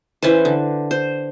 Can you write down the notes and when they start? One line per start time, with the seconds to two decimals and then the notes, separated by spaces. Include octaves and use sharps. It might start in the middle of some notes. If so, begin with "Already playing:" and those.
0.22 E3 C#4 B4 C5
0.45 D3
0.91 C5